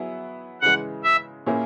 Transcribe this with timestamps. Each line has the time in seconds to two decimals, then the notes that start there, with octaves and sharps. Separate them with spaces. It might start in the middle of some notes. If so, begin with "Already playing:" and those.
Already playing: F#3 B3 E4 G#4
0.62 C#3 E3 G#3 F#5
1.04 E5
1.47 A#2 A#3 C#4 E4 G#4